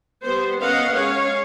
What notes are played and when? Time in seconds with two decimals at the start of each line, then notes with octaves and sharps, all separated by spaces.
0.24 G3 B3 C5
0.62 B3 C#4 A#4 D#5 F5 F#5
0.94 G#3 C#4 C#5 F5